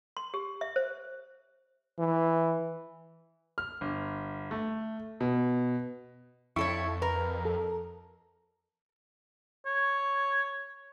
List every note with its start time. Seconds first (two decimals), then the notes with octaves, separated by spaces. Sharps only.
0.17 C6
0.34 G4
0.61 E5
0.76 C5
1.99 E3
3.58 F6
3.81 G1
4.51 A3
5.21 B2
6.56 F2 E4 A4 C#5 C#6
7.02 A#4 B4
7.45 A4
9.66 C#5